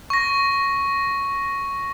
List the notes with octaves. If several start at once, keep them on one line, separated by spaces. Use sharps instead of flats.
C#6 A#6